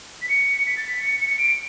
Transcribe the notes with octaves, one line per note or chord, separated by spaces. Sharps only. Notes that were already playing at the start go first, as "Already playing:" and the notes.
B6
C#7
B6
A6
B6
C#7
C#7
D7